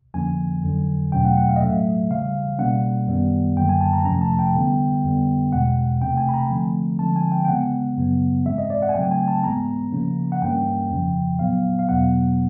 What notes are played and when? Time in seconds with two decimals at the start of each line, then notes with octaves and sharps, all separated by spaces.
0.14 F2 D3 F3 A#3 C#4 G#5
0.63 F2 D3 F#3
1.12 E2 B2 F#3 A3 C#4 G5
1.25 F#5
1.37 F#5
1.49 F5
1.56 D#5
1.61 A2 F#3 A3 E5
2.10 C#3 E3 G3 F5
2.59 B2 G3 A#3 C#4 F#5
3.07 F#2 D#3 G3 B3
3.57 F#2 D3 F#3 A#3 G5
3.69 G#5
3.81 A5
3.93 A#5
4.05 F2 C3 F3 A3 C#4 A#5
4.22 A5
4.39 G5
4.54 D3 G3 B3
5.04 F2 D3 G3 B3
5.53 E2 B2 G#3 F#5
6.01 C3 E3 A3 C4 G5
6.17 G#5
6.29 B5
6.34 A#5
6.50 D3 F3 A3 C4
6.99 D3 F3 G#3 C4 A5
7.16 G#5
7.32 G5
7.45 G5
7.48 C#3 E3 G#3 B3 F#5
7.97 F#2 C#3 F#3 B3
8.45 G#2 E3 G#3 C4 E5
8.58 D#5
8.70 D5
8.82 F#5
8.89 G#5
8.95 C#3 F#3 A3 C4 G5
9.11 G#5
9.28 A5
9.43 G#2 E3 G#3 B3 A#5
9.92 C#3 F3 A#3 C#4
10.32 F#5
10.42 G2 E3 G3 A#3 C#4 G5
10.91 F2 C#3 F3
11.39 A#2 F#3 B3 F5
11.79 F5
11.89 E2 B2 F#3 B3 F#5